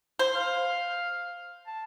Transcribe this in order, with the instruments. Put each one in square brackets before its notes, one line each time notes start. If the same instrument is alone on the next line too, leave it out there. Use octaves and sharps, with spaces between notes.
[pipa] C5
[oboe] F5
A5